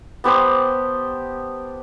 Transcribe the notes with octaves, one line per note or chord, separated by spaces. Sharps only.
B3 G4 C5 A5